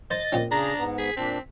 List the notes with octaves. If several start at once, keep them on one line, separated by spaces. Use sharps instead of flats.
C5 D#5 A6
A#2 C4 C#4
C#3 D4 G#4 A#5
G#2 B3
G#4 B6
A#2 C4 D4